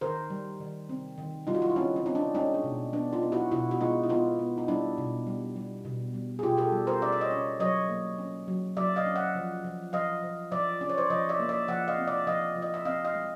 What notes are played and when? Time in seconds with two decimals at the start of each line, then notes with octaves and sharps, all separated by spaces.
0.01 D#3 A#4 C5
0.30 G3
0.60 D#3
0.89 C4
1.18 D#3
1.47 G3 D#4 F4
1.55 F#4
1.62 F4
1.70 E4
1.76 C4 C#4 D#4
1.96 C#4
2.06 C4 D#4
2.15 D4
2.35 G#3 C#4 D#4
2.54 D4
2.64 B2
2.93 B3 D4
3.13 D#4 F4
3.23 B3
3.32 E4 F#4
3.51 B2 E4 F#4
3.71 F#4
3.80 G#3 D#4 F4
4.03 E4
4.09 B3 D#4 F4
4.39 B3
4.58 D#4
4.68 G3 D4 E4
4.98 B2
5.27 G3
5.56 G3
5.85 B2
6.14 G3
6.39 G#4
6.43 B2 F4 G4
6.57 G4 A4
6.72 G3
6.87 A#4 C5
7.02 C#4 D5 E5
7.13 E5
7.21 C#5 D#5
7.31 C#4
7.60 F#3 C#5 D#5
7.89 A#3
8.18 C#4
8.48 F#3
8.77 F#3 D5 E5
8.96 D#5 F5
9.06 C#4
9.16 E5 F#5
9.35 F3
9.64 F3
9.93 F3 D#5 F5
10.23 F3
10.52 F3 D5 E5
10.81 C#4 D5
10.90 C#5
10.98 C5 D5
11.10 F3 C#5 D#5
11.29 D5 E5
11.40 A#3
11.49 D5 E5
11.68 F3 E5 F#5
11.88 D#5 F5
11.98 C4
12.07 D5 E5
12.27 F3 D#5 F5
12.56 F3
12.62 D#5
12.74 E5
12.85 C4 D#5 F5
13.05 D#5 F5
13.15 G#3